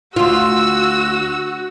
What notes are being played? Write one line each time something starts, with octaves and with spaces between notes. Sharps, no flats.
D2 F4 F#4 E6